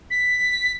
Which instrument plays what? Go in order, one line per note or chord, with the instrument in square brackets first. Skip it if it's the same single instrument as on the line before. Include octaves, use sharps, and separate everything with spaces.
[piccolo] B6